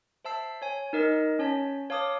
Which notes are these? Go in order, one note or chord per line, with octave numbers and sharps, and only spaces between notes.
C5 E5 A5 E6 C7
C#5 G#5
D#4 A#4 D#5
C#4 C#5 A5 B6
C#5 F5 A5 D6 D#6